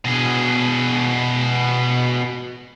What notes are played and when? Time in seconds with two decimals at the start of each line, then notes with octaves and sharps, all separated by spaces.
0.05 B2 G#4